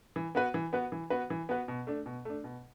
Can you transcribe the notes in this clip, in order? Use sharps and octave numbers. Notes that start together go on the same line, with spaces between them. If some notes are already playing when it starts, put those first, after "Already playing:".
E3
B3 F#4 B4
E3
B3 F#4 B4
E3
B3 F#4 B4
E3
B3 F#4 B4
B2
A3 D4
B2
A3 D4
B2